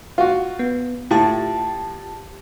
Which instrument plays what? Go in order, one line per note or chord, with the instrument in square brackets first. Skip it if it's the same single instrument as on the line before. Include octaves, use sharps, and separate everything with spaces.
[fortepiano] F4 F#4
[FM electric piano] B3
[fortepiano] A2 [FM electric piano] F4 G4 A5